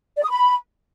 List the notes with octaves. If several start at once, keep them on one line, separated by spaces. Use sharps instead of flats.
D5
D#6
B5